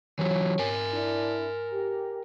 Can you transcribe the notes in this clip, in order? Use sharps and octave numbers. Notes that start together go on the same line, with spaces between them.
E3 F#3 C#4 G4 C#5
A#4 G#5
D4 E4
G4